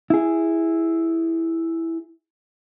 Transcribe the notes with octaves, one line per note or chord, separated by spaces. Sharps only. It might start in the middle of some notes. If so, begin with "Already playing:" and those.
E4 G#4